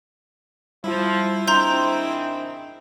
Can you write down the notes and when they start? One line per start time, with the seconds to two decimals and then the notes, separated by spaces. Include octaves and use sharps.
0.84 F3 G3 E4 F4
1.48 G#2 D#3 C4 D4 E5 A#5 C6 G6